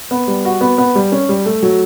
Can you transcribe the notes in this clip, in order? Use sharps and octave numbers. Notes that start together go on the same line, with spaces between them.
B3
G3
F#4
B3
B3
G3
C#4
G3
A3
F#3